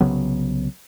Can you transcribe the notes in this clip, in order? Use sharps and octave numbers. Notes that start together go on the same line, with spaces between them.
C2 C#3 F#3 B3